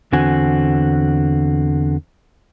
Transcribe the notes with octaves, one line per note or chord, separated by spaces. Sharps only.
E2 D3 C4 F#4 G#5